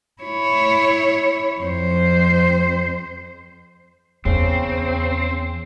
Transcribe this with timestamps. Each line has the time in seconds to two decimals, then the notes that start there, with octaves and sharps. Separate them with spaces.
0.22 E4 C#5
1.60 F2 C5
4.25 E2 C#3 C4